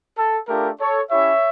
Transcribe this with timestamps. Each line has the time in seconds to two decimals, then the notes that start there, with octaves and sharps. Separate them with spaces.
0.17 A4
0.48 A3 D4 F4 G4 A#4
0.80 A4 C#5
1.10 C#4 E4 G4 C#5 E5